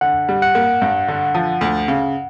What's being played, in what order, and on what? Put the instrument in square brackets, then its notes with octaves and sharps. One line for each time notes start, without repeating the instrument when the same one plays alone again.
[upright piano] D3 [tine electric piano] F#5
[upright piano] G3
[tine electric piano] F#5
[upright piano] A#3
G2
D3
F3
D2
C#3